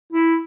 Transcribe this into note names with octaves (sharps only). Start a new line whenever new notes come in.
E4